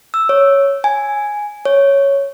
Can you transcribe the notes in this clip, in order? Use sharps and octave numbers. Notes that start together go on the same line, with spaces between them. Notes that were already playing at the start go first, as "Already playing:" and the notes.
E6
C#5
G#5
C#5